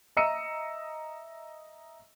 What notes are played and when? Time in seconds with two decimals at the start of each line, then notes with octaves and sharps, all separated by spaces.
0.17 D#5 E5 A#5 E6 C#7 D#7